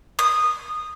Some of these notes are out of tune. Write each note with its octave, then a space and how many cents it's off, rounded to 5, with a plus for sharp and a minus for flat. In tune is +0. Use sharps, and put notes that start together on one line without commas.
D#6 -15